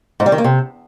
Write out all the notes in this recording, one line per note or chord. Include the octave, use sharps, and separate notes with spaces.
G#2
G3
D#3
A#3
C3